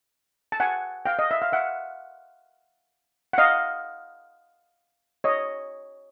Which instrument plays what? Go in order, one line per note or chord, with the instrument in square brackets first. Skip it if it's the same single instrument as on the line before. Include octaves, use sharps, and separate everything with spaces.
[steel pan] A5
F#5 G#5
F5 G5
D#5
E5
F5
E5 F#5
F#5
D#5 F5
C#5 D#5